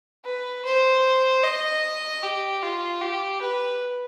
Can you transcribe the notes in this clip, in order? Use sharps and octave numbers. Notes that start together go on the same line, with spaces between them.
B4
C5
D#5
G4
F4
G4
B4